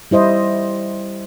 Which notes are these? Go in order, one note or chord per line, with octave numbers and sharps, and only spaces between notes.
G3 E4 C5 D#5